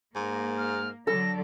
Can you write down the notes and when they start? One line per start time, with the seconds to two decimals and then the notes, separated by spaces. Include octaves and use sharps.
0.15 G#2 A#3
0.58 F6
1.07 D3 F#3 A4 D5 A#6